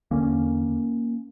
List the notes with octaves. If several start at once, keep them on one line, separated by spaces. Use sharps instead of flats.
E2 D3 A#3 C#4